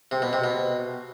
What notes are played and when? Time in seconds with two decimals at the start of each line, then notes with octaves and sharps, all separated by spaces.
0.11 C3
0.22 B2
0.33 C3
0.44 B2